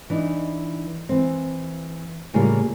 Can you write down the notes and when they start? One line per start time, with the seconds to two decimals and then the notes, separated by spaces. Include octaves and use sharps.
0.10 E3 D4 D#4
1.09 E3 C4
2.34 A2 C#3 G3 A#3 F4